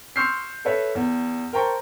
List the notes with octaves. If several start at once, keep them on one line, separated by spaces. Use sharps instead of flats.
C6 C#6 E6 F6 G6 C7
A4 B4 C#5 E5
E2
A#4 C5 G5 A5 A#5 C#6